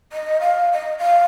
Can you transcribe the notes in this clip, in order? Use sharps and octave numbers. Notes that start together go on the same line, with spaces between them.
D#5
F5
D#5
F5